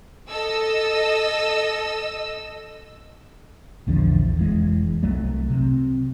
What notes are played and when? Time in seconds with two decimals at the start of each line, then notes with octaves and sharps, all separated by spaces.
0.29 A4 D#5 E6
3.87 A#1 E2 D3 F3
4.37 F1 E3 G#3
5.03 C2 F#3 A3
5.50 C3